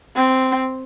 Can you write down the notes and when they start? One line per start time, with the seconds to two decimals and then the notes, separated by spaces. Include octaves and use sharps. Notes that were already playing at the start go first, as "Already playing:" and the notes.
0.16 C4